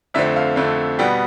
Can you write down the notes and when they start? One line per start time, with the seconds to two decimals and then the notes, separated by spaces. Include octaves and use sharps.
0.14 F2 D3 A3 C4 E5
0.36 F5
0.56 F2 D3 A3 C4
0.99 B2 G3 B3 G5